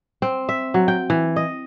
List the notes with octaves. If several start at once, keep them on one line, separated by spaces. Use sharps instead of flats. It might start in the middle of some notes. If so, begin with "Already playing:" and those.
C4
E5
F#3
G5
E3
D#5